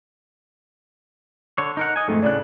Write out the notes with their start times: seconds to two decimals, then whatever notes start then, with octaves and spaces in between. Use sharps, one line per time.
1.58 D3 C#5
1.77 D#4 A#4 F#5
1.96 D#5 G#5
2.08 F2 G#2 D#3 A3
2.22 A2 C#3 D5 F#6